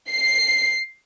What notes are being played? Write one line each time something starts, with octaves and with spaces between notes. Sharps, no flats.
C7